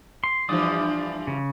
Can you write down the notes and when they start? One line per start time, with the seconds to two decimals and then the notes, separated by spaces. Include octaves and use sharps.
0.24 C6
0.49 G2 E3 F3 D5 D6 D#6
1.27 C#3